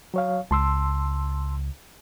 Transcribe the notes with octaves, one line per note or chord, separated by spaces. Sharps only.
F#3 C#5 F5
C#2 A5 C6 E6